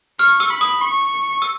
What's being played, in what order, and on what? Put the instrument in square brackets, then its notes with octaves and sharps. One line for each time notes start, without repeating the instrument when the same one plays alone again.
[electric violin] C#6 [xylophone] F6
[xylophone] E6
[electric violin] B5
[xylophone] D#6
[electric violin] C#6
[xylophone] E6